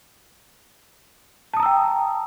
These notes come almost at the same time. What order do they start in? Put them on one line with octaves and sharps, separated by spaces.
A5 D#6 A#5 E6 G5